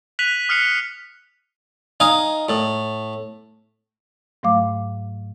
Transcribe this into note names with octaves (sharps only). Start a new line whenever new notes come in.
F#6 B6 D#7 F7 F#7
D#6 F6 C7 C#7 F7
D#4 F5 G#5
A2
G#2 F#3 A3 F5 D6